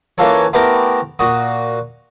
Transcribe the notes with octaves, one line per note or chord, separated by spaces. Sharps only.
E3 A#3 C#4 F4 A4 C#5
A3 B3 C4 E4 G4 A#4
A#2 F#4 D#6